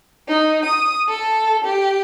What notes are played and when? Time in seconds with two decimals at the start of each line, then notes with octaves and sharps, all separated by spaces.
0.28 D#4
0.66 D#6
1.08 A4
1.65 G4